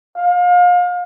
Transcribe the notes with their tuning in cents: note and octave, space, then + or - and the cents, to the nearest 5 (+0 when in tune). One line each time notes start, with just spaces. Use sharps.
F5 +30